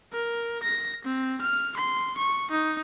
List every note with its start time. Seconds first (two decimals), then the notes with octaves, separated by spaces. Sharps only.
0.13 A#4
0.63 A#6
1.05 C4
1.41 F6
1.76 C6
2.18 C#6
2.51 D#4